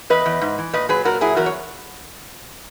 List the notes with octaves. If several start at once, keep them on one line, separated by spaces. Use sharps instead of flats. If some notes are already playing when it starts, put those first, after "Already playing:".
E2 B4 D#5
E2
G#2
E3
A#2 B4 D#5
F#3 G#4 B4
A#2 F#4 A#4
F#3 E4 G#4
E2 F#4 A#4
C#5